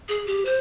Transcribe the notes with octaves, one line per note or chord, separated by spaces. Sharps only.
G#4
G4
C5